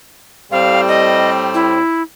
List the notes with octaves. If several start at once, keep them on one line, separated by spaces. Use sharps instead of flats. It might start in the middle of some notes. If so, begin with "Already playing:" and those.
A2 G3 C4 F5
D#5
E4